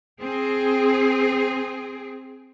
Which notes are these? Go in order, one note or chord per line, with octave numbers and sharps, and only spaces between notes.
C4 G#4